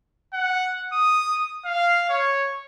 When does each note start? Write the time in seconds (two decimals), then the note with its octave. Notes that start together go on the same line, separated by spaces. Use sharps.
0.33 F#5
0.93 D#6
1.65 F5
2.10 C#5